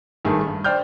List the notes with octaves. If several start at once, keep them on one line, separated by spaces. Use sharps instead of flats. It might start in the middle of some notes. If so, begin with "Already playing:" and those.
G#1 G2 D#3 A3 G#4
G2
C5 D5 G5 F6 G6